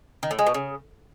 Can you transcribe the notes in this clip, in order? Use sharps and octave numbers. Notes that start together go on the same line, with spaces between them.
D#3
A2
G#3
B2
C#3